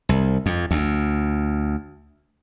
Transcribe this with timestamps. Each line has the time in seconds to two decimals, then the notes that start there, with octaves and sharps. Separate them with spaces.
0.09 C2
0.46 F2
0.71 D2